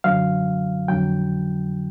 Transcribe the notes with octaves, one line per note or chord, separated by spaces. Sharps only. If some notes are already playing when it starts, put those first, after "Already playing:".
F#2 D3 F#3 F5
F2 D3 F#3 G5